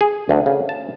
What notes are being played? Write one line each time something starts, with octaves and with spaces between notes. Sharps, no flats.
G#4
D2
C#3
A5